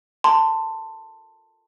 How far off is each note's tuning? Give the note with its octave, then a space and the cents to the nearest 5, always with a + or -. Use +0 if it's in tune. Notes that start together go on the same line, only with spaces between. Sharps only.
A5 +15 C6 -10